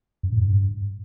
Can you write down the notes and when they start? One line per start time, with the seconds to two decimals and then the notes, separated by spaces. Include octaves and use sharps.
0.23 F#2
0.32 A2
0.41 G2